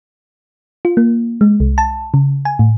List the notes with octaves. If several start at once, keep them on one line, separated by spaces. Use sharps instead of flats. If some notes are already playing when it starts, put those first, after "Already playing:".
F4
A#3
G#3
C2
A5
C#3
G#5
A2